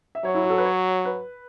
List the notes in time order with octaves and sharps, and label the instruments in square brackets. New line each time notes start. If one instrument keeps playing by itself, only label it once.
[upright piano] E5
[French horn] F#3 [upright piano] C#5
[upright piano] E4
F#4
A4
B4
C#5
B4